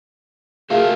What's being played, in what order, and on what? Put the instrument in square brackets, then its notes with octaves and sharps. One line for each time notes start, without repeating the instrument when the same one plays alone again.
[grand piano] A3 [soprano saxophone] F4 [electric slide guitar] F#4 A#4 F5 [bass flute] G#4